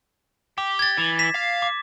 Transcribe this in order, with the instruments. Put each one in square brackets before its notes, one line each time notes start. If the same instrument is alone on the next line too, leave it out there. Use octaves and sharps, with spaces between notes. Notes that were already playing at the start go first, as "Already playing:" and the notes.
[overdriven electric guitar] G4 [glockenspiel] D6
[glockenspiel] G#6 A6
[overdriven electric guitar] E3
[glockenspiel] B6 E7
[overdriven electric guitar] F5
[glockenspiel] D6